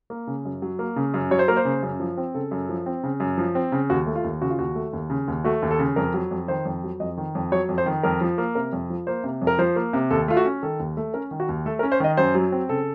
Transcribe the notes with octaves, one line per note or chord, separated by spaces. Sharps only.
A#3
C#3
F#2
F#3
A#3
C#3
F#2
F#3 C#5
C5
A#3 A#4
C5
C#3
F#2
F3
C4
C#3 A4
F#2
F3
C4
C#3
F#2
F3
C4
C#3
D#2 F#4
A3
F4
D#2
C#3 F#4
F4
D#2 F#4
A3
D#2
C#3
D#2
A3 F#4
D#2
A4
C#3
F2 A#4
F#3
F2
D#3 C5
F2
F#3
F2 D#5
D#3
F2
F#3 C#5
F2
C5
D#3
F2 A#4
F3
A#3
C3 A#4
F2
F3
A#3 C5
C3
F2
A#4
F3 C5
A#3
C3
D#2 A4
A3 F4
F#4
C#4
D#3 A4
D#2
A3
C#4 A#4
D#3
F#4
D#2
A3 A4
A#4
C#4
C5
D#3 D#5
F#2 C5
F#3
C4
C#3 A4